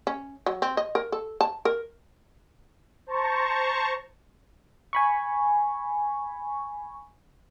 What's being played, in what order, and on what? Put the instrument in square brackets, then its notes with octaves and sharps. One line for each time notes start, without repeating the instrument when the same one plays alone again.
[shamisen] C#4
F#3
C4
D#5
A#4
A4
A5
A#4
[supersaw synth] C5 A5 A#5 C#6
[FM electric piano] G#5 B5 C#6